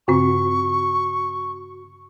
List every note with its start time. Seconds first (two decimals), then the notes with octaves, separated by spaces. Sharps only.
0.08 G2 C#3 C4 F#4 C#6